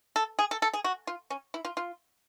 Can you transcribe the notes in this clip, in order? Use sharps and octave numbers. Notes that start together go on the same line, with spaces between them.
A4
G#4
A4
A4
G#4
F#4
F4
C#4
E4
F4
F4